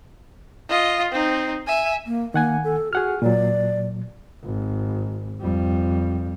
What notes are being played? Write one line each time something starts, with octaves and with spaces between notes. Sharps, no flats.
F4 D#5
C4 D#4
E5 G#5
A#3
D#3 A#3 F#5 G#5
A4
F#4 G#4 F#5 F6
A#2 F#3 D5
G#1
F2 G3